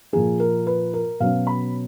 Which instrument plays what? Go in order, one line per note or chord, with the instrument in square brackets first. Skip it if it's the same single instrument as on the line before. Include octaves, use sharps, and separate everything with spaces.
[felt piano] A#2 F3 A#3 G#4
A#4
B4
A#4
B2 F#3 C#4 F5
B5